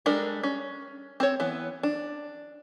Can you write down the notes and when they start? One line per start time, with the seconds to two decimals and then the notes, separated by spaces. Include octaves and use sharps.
0.06 G3 G#3 D4 A4 A#4
0.43 C#4
1.20 C4 C5 C#5
1.40 E3 B3
1.83 D4